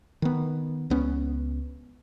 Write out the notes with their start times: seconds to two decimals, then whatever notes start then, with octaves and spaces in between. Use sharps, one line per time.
0.22 D#3 B3
0.90 C#2 B3 C#4